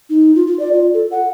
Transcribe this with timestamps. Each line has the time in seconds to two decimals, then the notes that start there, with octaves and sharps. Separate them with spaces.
0.10 D#4
0.35 F4
0.47 F4
0.59 D5
0.73 F4
0.94 A4
1.11 F#5